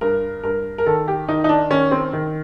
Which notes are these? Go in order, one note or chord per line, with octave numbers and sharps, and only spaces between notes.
G2 A#4
G2 A#4
A#4
D#3 A4
G4
D#3 D#4
D#4
D4
D#3 C#4
C4
D#3